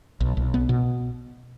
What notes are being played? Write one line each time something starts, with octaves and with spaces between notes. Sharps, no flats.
B1
B1
B3
B2